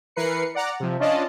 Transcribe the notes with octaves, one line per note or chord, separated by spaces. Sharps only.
E3 A#4 B4 C7 C#7
D5 F#5 A#5
C3 F3
C#4 D4 F4 D5 D#5 A5